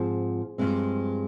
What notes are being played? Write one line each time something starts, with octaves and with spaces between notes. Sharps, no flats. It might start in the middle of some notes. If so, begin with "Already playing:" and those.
Already playing: G#2 F3 C4 G#4 C5
G2 F3 G#3 C4